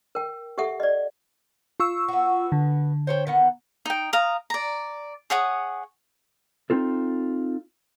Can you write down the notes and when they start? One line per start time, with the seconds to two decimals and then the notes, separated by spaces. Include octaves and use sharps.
0.15 A#4 G5
0.58 G4 A4 E5 F#5
0.80 D5 D#5
1.80 F4 C#6 E6
2.08 B3 F#4
2.52 D3
3.07 C5 C#5 G5
3.27 D#3 B3 F#5
3.85 D#4 G5
4.13 F5 A#5 D#6
4.50 D5 A#5
5.30 G#4 C#5 F#5 D#6
6.70 C4 D#4 F4 A4